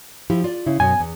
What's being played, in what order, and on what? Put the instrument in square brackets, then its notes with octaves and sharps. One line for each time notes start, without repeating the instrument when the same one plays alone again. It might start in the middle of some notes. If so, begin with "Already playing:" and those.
[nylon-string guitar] F3 E4 G4
F4 D5
[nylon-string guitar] C#3 [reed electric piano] E4
[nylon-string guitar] F#2 B2 [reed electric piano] G#5
[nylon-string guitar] E2